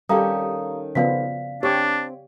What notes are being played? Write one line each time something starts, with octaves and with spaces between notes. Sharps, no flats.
D#3 G3 C#4 G4 A4 F5 A#5 D#6
C#3 F3 B3 D5 F5 B6
C4 D4 G4 C#5